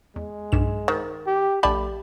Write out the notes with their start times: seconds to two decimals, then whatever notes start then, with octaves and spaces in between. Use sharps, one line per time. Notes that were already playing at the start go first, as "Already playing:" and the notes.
0.16 E2 G#3
0.52 B1 G2 E7
0.88 D#3 C5
1.27 G4
1.63 A#1 A3 G4 D5 A5 B5